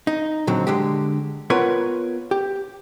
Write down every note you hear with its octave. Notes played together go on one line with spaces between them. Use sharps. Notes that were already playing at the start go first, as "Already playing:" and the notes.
D#4
A#2 D3 F#3 C4
D3 G#3 G4
B3 F4 A#4 B4 C#5
G4